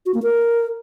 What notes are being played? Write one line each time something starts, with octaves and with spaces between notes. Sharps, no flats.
F#4
A#3
A#4